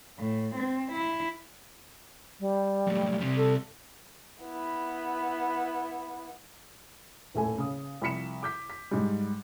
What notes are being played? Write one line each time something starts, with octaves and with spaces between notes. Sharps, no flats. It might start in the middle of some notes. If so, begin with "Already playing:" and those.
A2
C4
E4
G3
F#2 A2
C3 G3
A4
B3 E4
D#1 A2 A4 G#5
C#3 D#6
C2 F3 B5 B6 C#7 E7
D6 G6 B6
B6
G#2 G3